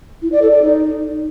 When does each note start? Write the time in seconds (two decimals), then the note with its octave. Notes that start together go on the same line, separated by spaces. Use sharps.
0.22 E4
0.32 D5
0.42 A4
0.52 D5
0.62 D#4